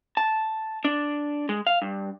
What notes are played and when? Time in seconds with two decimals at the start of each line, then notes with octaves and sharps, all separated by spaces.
0.17 A5
0.85 D4
1.49 G#3
1.67 F5
1.82 G2